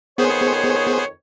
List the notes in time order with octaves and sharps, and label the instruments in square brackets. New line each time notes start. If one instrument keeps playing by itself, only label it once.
[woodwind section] F2 D#3 C#5 [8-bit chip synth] B3 G#4 C5